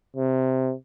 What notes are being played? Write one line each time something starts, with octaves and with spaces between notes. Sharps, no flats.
C3